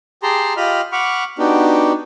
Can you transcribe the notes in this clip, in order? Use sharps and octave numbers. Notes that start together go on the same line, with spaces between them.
G4 G#4 A5 A#5 C6
F4 G4 D#5 B5 F6
F#5 B5 C#6 D6 F6
B3 D4 D#4 F#4 G4